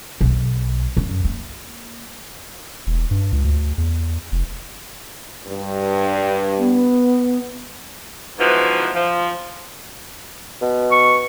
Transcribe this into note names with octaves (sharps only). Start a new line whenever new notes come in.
B1
F#2
A#3
E1
G2
C#2
D2
E2
F1
G2
B3
G#2 B2 E3 F3
F3
B2
C#6